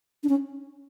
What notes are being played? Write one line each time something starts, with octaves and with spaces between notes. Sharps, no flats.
D4
C#4